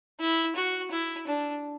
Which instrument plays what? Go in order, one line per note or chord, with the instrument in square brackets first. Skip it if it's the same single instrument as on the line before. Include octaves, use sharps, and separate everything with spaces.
[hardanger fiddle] E4
F#4
E4
D4